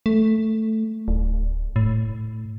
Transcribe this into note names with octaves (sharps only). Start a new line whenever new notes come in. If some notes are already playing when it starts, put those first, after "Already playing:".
A3
D1
A2